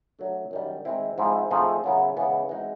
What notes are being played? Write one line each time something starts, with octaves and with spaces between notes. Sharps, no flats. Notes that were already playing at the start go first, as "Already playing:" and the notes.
F#3 A3 D4
F#2 D#3 G3
D#3 G#3 C4 E4
G#2 F3 G#3 C4 E4
F3 A3 C4 D#4 G#4
F#2 C#3 F#3 B3 E4
C#3 E3 G#3 B3
E3 G#3 C4 D#4 F#4